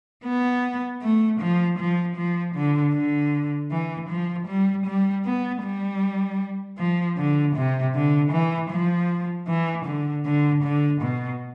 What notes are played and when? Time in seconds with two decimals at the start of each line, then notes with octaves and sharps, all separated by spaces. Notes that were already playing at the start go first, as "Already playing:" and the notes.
0.25 B3
1.02 A3
1.41 F3
1.78 F3
2.16 F3
2.55 D3
2.94 D3
3.71 E3
4.09 F3
4.48 G3
4.86 G3
5.25 B3
5.63 G3
6.78 F3
7.18 D3
7.56 C3
7.94 D3
8.32 E3
8.70 F3
9.47 E3
9.86 D3
10.25 D3
10.63 D3
11.01 B2